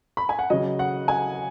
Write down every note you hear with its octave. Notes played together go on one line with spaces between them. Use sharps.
B5
G#5
F#5
C#3 F#3 D#5
F#5
G#5